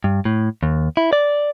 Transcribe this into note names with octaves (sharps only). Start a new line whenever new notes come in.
G2
A2
D#2
E4
D5